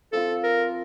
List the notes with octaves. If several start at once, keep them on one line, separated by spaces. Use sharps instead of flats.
F3 C4 F4 A4
A#4